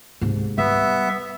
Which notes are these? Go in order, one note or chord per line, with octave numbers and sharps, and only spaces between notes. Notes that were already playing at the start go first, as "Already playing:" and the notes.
G#2 C3
G3 B3 E5